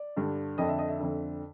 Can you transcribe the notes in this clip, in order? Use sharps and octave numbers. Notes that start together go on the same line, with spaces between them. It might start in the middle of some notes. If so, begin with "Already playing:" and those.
Already playing: D5
G2 D3
F2 D3 D#5
E5
D#5
E5
F2 D3